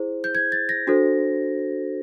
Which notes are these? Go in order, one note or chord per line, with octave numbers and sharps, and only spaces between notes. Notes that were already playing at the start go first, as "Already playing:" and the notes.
Already playing: E4 G#4 C5
G6
G#6
A6
A#6
D4 F#4 A4 C5